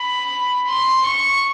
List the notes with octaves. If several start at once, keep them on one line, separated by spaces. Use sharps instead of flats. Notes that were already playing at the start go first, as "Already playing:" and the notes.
Already playing: B5
C6
C#6